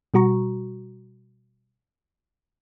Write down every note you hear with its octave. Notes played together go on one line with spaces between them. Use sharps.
B2 G3 F#4 A#5 C#6